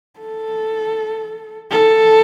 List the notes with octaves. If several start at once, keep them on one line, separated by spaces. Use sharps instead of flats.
A4
A4